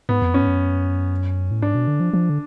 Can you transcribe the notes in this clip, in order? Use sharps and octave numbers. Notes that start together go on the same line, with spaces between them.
G#2 B3
F2
F#2 C#4
G#2
F#2
A2
G#2 D4
B2
D3
F3
F3
D3